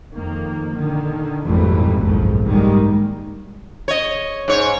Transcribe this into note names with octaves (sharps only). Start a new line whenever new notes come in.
F2 D#3 A#3
A#2 D3 D#3
G#1 F2 A#2 E3 G3 A3
F#1 B1 F2 G#2 F3
G#2 D#3 G3 G#3 A#3
C#5 D#5
G#2 C#5